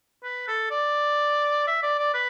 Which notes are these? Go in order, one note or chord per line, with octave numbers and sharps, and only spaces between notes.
B4
A4
D5
E5
D5
D5
B4